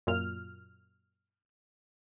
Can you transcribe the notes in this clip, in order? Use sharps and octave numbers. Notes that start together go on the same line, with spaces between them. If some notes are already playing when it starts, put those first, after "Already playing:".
F#2 A#2 F6